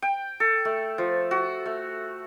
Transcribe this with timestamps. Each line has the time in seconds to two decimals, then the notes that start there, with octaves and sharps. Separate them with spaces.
0.02 G5
0.40 A4
0.65 A3
0.98 F3
1.31 F#4
1.66 A3